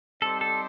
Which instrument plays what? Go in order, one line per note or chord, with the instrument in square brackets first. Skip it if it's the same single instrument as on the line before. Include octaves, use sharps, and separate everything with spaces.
[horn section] G3 C4 D#4 G4 C5 [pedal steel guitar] A4
[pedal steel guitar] A4